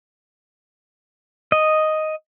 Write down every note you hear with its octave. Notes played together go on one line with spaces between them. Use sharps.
D#5